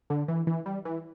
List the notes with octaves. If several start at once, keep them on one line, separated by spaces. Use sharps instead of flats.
D3
E3
E3
G3
E3